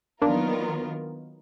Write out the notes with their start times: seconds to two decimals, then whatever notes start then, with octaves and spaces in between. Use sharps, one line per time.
0.22 D#3 F#3 A#3 B3 D4 F4 A#4